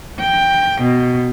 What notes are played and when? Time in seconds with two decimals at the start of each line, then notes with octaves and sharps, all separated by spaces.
0.19 G5
0.80 B2